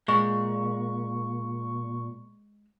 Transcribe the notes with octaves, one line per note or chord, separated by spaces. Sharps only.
A#2 G#3 C#6